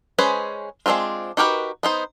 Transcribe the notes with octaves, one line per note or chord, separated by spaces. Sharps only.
G#3 C#4 G#4 B4 C5
G#3 A#3 C4 D4 F4
D#4 F#4 G4 A#4 B4
B3 D#4 C5